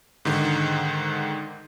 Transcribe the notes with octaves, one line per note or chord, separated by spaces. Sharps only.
G#2 D3 D#3